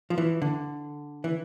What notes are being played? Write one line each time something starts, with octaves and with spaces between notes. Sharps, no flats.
F3
E3
D3
E3